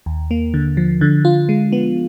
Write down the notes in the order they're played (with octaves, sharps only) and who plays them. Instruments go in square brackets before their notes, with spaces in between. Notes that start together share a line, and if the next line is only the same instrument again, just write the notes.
[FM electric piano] D#2
A#3
D3
F3
D3
F4
G#3
B3